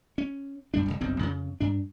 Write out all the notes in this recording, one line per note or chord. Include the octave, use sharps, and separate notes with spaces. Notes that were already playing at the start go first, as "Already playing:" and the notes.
C#4
F#2 G3 D4
D1 C2
F#1 B1 G2 C4
F2 C#3
G2 D4